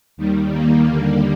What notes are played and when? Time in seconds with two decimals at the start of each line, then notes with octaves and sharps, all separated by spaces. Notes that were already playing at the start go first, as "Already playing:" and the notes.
0.17 D#2 D#3 G3
0.52 A#3
0.86 D#2 D3 G3